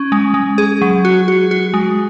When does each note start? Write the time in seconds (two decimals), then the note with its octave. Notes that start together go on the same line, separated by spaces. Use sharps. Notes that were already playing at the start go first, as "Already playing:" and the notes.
Already playing: C#4
0.12 G#3
0.34 G#3
0.58 G#4
0.82 F#3
1.05 F#4
1.28 F#4
1.51 F#4
1.74 G#3